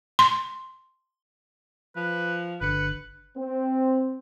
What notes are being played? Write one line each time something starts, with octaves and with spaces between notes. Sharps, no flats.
C6
F3 B4
G1 D3 B4 C#7
C4